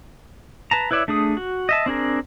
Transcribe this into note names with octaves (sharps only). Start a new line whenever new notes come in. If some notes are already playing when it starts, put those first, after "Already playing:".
B4 A5 A#5
E4 B4 C#5 D5 E5
A3 D4 G#4 D#6
F#4
D#5 E5 A5
C4 D4 G#4 A#4